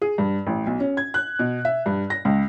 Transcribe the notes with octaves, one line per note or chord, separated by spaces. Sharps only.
G#4
G2
A1
B1
C#4
G#6
F#6
B2
E5
G2
A#6
C#2